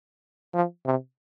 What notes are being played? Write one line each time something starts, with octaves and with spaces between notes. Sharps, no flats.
F3
C3